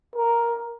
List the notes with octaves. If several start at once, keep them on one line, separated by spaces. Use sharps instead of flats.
A#4